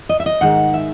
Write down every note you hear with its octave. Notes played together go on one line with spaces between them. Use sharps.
D#5
E5
D#5
G#2 D#3 G#3 D#4 F#5
E5